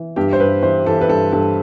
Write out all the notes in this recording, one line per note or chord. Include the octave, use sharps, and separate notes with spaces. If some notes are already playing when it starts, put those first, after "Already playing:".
Already playing: E3
G2 G4
C5
G2 B4
E3 C5
E3 A4
B4
G2 A4
G2 A4